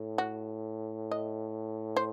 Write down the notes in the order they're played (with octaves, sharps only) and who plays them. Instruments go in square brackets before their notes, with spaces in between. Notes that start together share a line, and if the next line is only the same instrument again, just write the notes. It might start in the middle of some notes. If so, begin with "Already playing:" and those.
Already playing: [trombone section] A2
[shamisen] F#4
D#5
C5